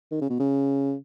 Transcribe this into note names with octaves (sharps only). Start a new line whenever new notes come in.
D#3
C#3
B2
C#3